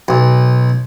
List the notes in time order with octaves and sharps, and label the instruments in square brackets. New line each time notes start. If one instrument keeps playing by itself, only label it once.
[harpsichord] B1